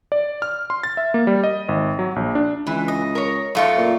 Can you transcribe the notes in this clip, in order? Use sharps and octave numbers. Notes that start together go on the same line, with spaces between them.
D5
F6
C6
A6
E5
A#3
G3
D#5
G#1
F#3
A#1
D4
C#2 E3
D#5
A#4 C#5
F#2 A3 D#4 F4 C#6
A#2